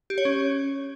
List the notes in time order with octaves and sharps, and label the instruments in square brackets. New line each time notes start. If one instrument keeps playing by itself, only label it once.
[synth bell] G4
C#5
C#4